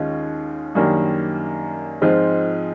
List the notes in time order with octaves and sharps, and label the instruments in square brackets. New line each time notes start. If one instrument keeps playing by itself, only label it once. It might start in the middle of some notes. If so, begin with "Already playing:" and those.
Already playing: [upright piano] D#2 D#3 G#3 C#4 F4
F#2 D#3 G3 A#3 D4
G#2 F3 G#3 C4 F4